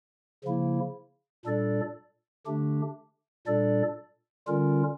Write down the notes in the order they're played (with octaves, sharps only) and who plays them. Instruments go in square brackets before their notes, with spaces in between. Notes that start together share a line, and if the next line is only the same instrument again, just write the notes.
[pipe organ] C#3 F3 A#3 E4
A#2 G3 D4 A4 D5
D3 A3 D4 G4
A#2 G3 D4 A4 D5
D3 G3 C#4 F4 A#4